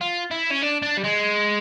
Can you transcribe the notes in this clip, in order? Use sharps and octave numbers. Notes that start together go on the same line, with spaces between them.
F4
E4
C#4
D4
D4
G3
G#3